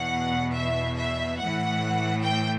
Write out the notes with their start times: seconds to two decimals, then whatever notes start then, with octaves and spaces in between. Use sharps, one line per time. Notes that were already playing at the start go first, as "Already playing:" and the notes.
Already playing: E2 B2 F#5
0.54 E5
0.97 E5
1.40 A2 E3 F#5
2.23 G5